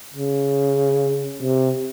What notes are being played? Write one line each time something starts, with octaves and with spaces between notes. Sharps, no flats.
C#3
C3